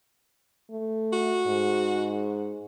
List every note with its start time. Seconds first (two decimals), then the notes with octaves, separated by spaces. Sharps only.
0.71 A3
1.13 F#4
1.47 G#2